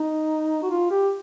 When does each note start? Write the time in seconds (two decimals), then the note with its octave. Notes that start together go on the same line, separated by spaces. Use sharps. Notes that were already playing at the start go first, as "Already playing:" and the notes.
Already playing: D#4
0.62 F#4
0.70 F4
0.90 G4